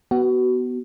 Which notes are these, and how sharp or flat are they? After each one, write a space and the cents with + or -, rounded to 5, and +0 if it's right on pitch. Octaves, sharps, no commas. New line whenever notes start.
B3 +0 F#4 +25